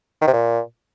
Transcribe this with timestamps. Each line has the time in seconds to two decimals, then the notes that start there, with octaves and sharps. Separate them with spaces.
0.22 D#3
0.28 C3
0.33 A#2